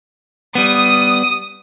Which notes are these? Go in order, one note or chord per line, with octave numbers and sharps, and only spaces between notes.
G3 B3 D#6